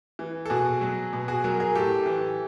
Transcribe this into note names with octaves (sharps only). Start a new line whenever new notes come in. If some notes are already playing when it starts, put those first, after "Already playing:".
E3
A4
B2 F#4 G#4
F#3
B2
F#4 G#4
F#3 G#4 A#4
G#4 A#4
A2 G4 A4
E3